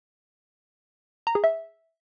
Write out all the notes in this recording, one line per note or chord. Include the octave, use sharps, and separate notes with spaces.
A#5
G#4
E5